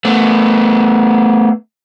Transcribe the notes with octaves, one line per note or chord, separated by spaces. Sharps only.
A3 B3